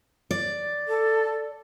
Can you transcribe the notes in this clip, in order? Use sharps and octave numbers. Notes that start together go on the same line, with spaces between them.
D5
A4